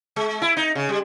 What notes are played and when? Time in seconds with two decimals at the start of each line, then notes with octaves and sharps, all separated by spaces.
0.16 G#3
0.42 E4
0.57 D#4
0.75 C#3
0.89 G3